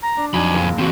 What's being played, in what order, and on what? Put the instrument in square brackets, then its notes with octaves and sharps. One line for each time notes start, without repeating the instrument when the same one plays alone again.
[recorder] A#5
[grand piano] D4
[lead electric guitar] F2 B5 [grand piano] F#3 D4 D#4 [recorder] G#5
[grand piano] F#1 D#2
[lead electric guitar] E3 C4 [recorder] F#4